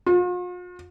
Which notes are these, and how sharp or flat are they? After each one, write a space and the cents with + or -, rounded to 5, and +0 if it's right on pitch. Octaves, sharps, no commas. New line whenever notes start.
F4 +45